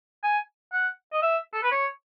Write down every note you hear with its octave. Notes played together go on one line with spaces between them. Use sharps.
G#5
F#5
D#5
E5
A4
B4
C#5